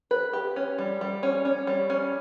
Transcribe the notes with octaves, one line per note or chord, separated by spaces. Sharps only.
B4
G4
C#4
G3
G3
C#4
C#4
G3
C#4